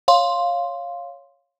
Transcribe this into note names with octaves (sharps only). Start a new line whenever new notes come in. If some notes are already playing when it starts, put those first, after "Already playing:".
C#5 F5 C6